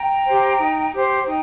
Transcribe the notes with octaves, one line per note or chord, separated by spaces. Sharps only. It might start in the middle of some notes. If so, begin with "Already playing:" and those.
Already playing: G5 A#5
G4 C5
D#4
G4 C5
D#4 G5 A#5